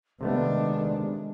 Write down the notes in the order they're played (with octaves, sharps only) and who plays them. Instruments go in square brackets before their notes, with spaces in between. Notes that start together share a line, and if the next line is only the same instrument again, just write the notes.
[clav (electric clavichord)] C3 A3 B3 [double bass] D#3 D4 [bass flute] G#3